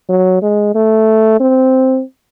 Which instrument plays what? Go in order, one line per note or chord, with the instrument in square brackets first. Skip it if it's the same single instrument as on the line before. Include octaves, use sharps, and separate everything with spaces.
[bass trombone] F#3
G#3
A3
C4